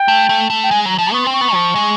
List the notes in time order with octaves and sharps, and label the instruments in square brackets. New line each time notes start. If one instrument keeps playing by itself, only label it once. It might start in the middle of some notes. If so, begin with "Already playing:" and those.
Already playing: [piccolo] G5
[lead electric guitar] A3
A3
A3
[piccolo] G5
[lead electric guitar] G#3 [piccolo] G#5
[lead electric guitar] F#3 [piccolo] A#5
[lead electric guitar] F3 [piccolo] A5
[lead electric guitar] B3 [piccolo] C#6
[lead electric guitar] C4 [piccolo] C6
[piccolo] C#6
[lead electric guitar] B3
F3
G#3